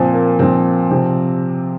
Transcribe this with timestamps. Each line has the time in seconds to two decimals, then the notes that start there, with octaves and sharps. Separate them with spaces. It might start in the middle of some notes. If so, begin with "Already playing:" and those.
Already playing: A#2 F3 C4
0.14 A#3
0.39 A#2 F3 C4
0.91 C3 F3